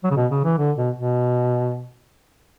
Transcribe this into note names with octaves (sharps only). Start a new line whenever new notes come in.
F#3
C#3
B2
C#3
E3
D3
B2
B2